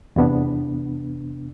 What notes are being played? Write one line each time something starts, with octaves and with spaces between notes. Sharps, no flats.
E2 C3 B3 D4